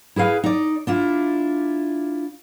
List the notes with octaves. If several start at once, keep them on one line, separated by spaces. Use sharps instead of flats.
E4 G#4 B4 F5
D#4 D5
D4 E4 F4